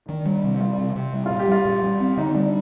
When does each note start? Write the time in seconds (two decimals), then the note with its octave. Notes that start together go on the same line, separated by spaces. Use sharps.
0.09 D#3 D4
0.26 G3
0.44 C3
0.61 G3 F4
0.78 C3
0.96 C3
1.13 G3
1.26 F4
1.30 A#2
1.39 G4
1.48 G3 F4
1.65 A#2
1.83 G3
2.00 C4
2.17 D3 D#4
2.35 G3 D4